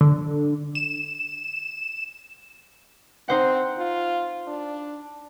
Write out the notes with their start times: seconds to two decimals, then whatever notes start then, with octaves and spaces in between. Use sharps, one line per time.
0.01 D3
0.75 E7
3.28 C4 D#4 C5 F#5
3.77 F4
4.47 D4